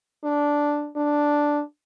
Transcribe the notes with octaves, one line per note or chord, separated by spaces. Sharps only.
D4
D4